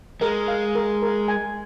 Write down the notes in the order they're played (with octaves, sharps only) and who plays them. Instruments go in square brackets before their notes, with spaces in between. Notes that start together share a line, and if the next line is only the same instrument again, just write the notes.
[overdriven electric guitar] G#3 [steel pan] A#4
[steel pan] F5
A#4
A#4
G#5